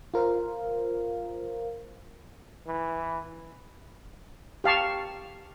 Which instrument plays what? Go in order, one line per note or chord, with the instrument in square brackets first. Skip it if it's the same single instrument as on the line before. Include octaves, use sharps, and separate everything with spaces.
[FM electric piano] F4 A#4 C5 F5
[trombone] E3
[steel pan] G4 F5 A5 C#6